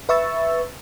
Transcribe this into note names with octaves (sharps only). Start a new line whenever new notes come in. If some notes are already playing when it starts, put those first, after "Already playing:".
B4 E5 C#6 E6 A6